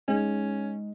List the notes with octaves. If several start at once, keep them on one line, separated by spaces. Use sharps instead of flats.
G#3 C#4 D#4